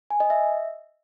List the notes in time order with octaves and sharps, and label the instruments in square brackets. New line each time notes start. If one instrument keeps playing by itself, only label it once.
[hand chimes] G#5
D#5
E5